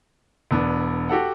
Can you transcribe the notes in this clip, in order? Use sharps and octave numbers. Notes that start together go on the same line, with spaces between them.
E1 B3 D4
F#4 G4 A4 F#5